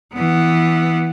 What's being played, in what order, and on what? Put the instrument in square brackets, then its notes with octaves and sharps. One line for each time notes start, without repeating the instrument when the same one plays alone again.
[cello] E3 B3